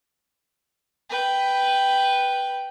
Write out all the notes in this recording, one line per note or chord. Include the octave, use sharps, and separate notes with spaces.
B4 G5